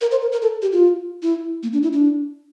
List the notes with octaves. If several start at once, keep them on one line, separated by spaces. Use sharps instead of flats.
A#4
C5
A#4
A#4
A4
G4
F4
E4
A#3
D4
E4
D4